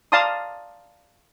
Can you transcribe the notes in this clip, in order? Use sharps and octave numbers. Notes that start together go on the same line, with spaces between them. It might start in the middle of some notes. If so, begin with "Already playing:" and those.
D5 F5 A5 A#5 C6 D#6